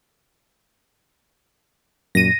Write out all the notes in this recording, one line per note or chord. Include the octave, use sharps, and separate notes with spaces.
F#2 A#2 A#6 D#7